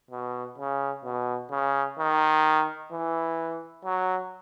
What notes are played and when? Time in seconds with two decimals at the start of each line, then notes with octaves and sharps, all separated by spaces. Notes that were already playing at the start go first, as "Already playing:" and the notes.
0.11 B2
0.58 C#3
1.05 B2
1.51 C#3
1.99 D#3
2.92 E3
3.85 F#3